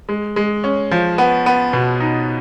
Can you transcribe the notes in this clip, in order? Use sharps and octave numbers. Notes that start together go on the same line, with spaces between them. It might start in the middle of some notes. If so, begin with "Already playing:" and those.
G#3
G#3
C#4
F3
B3
B3
B2
D#4